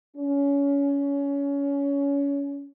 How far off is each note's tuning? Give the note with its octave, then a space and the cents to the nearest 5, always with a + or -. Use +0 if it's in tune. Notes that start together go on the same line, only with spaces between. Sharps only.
C#4 +25